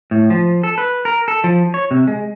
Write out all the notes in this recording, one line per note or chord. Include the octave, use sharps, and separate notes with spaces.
A2
F3
A4
B4
A#4
A4
F3
C#5
C3
G#3